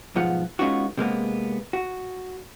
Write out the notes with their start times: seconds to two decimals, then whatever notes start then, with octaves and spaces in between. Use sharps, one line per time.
0.15 B1 G#2 F3 B3 F4 F#5
0.59 G#3 B3 C#4 D#4 F4 F#4
0.97 C3 G#3 A#3 B3
1.73 F#4